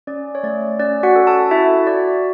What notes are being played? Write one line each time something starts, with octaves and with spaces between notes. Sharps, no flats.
C#4 D5
C#5
A3 D5
C#4 D5
F#4 F#5
A4
A4 A5
E4 F#4 E5
F#4 D5